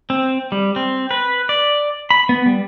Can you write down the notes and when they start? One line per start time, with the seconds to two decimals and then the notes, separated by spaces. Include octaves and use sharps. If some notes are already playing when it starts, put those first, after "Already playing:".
0.10 C4
0.52 G3
0.76 C4
1.11 B4
1.49 D5
2.10 B5
2.29 B3
2.46 G3